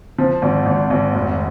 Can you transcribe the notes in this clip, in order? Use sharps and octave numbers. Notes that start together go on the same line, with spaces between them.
F3
G#1
G#1
G#1
F1